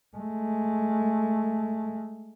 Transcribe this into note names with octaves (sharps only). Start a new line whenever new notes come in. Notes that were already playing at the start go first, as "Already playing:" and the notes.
G#3 A3